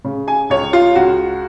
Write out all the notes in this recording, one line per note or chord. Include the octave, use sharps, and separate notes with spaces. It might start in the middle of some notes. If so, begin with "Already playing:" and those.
C#3
G#5
C#2 C#5
F4
C#2 F#4